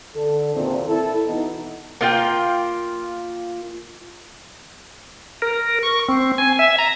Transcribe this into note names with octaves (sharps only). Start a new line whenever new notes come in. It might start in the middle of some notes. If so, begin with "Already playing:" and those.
D3 A4
E2 G2 A#2 D3 D#3 C4
E4 A4
B2 E3 B3 D#4
A#3 F4 G5
A#4
C#6
C4
G#5
E5
A#5